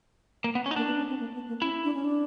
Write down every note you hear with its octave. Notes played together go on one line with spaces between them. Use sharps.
A#3
B3
C#4
D#4
A#3 D4
B3
C#4
C4
A#3
B3
A#3
C#4 E4
D4
C#4
D4